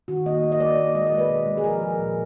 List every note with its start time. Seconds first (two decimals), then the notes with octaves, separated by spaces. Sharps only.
0.08 D#3 F#4
0.26 A#3 D#5
0.44 A#3
0.52 D#5
0.60 A#3 D5
0.78 A#3
0.95 G#3 D#5
1.07 D5
1.12 G#3
1.18 B4
1.30 B2
1.47 G#3
1.57 G#4
1.64 F3 A#4
1.82 F3
1.99 A#2